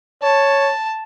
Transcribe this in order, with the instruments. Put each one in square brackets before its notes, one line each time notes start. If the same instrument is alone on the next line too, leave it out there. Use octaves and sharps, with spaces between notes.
[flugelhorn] C#5 [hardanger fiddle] A5